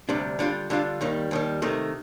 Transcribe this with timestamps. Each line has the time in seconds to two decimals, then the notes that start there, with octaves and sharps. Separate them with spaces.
0.09 D2 C3 G3 D4
0.39 D3 G3 D4 F4
0.70 D3 G3 D4 F4
1.01 D#2 D#3 G3
1.31 D#2 D#3 G3
1.62 C3 D#3 A3 D#4